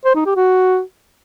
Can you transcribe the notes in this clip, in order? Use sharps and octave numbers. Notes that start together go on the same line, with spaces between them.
C5
D#4
G4
F#4